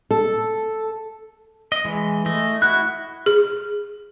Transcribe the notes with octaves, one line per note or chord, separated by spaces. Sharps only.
A4
D#5
E3 G#3
A3 D#5
E4 F#4 F#6
G#4